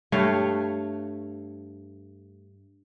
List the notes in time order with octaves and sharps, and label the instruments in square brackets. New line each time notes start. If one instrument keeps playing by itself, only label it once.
[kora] G2 A3 C#5 F5